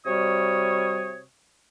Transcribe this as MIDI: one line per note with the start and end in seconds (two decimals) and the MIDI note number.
0.06 1.21 48
0.06 1.21 55
0.06 1.21 66
0.06 1.21 73
0.06 1.21 87